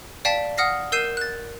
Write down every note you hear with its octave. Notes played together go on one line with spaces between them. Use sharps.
D5 F5 G5 A5 B6
F#5 D#6 F6 A#6 C7
A#4 E6 G6 C7 D#7 E7
F#6 A6